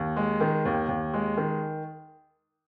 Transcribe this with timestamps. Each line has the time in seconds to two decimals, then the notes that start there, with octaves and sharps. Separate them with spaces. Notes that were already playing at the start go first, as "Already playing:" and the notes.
Already playing: D#2
0.16 G#3
0.40 D#3
0.65 D#2
0.89 D#2
1.14 G#3
1.37 D#3